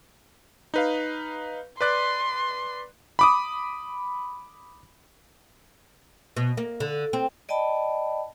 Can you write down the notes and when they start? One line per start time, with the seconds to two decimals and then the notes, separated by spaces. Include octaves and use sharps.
0.74 D#4 B4 F5
1.81 B4 D5 C6 F#6
3.19 B5 D6 D#6
6.37 B2
6.57 A#3
6.80 D3
7.13 C4
7.49 D5 D#5 G5 A5 B5